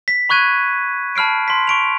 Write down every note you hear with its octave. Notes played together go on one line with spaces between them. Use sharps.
B6
B5 C#6 F#6 G#6 D#7
A5 B5 F6 C7 D7
C6 B6
C#6 D7 F7